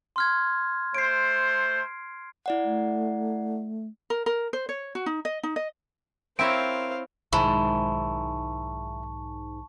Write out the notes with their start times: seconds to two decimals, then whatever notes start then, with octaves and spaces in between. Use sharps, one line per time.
0.16 C6 F6 G#6
0.95 A3 C5 C7 D7
2.46 E4 D5 F#5
2.64 A3
4.10 A#4
4.26 A#4
4.53 C5
4.69 C#5
4.95 F#4
5.06 D#4
5.25 D#5
5.43 D#4
5.56 D#5
6.39 C4 E4 A#4 C5 C#5 E5 F5 D7
7.33 B1 G#2 D#3 E4 A5 C#6